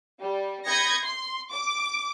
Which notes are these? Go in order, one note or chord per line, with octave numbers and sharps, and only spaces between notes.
G3
B5 D#6 G6 G#6 A#6 C#7
C6
D6